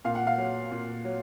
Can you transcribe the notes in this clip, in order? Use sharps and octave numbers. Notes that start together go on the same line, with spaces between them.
A#2 F5
F#5
F5
F#3
A#2
F#3